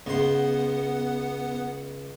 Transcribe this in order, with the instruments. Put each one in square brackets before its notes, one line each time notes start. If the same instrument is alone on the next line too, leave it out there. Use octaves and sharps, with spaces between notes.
[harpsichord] C#2 C6 [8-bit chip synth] B3 F#5